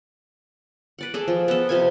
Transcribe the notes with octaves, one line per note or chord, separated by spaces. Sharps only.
B4 D5 F#5
G#4 A4 D5
F3
B3 A4
C3 F3 G#5